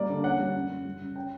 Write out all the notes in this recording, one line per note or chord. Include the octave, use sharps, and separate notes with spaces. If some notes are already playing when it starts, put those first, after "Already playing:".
Already playing: G3 A#3 D5
D3
C#4 F#5
G3
F#2
G3
G3
C#3
C#4 G5